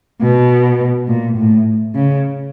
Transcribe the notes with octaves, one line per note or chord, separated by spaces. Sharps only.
B2
A#2
A2
C#3